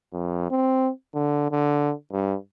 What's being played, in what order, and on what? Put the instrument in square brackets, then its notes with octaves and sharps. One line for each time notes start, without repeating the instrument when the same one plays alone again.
[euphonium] F2
C4
D3
D3
G2